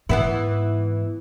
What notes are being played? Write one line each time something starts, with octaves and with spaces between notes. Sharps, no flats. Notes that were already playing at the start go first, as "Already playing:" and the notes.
G#2 E3 B3 E4